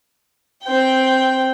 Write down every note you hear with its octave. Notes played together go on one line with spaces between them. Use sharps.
C4 G5